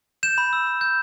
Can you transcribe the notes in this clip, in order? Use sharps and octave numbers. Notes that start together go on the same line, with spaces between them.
G6 E7
B5
E6
B5
G6